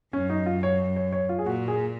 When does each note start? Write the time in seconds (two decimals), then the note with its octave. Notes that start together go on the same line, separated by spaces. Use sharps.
0.13 F#2 C#4
0.30 D#4
0.46 F4
0.63 C#5
0.96 C#5
1.12 C#5
1.29 F4
1.39 G#4
1.46 A#2 F#4
1.68 G#4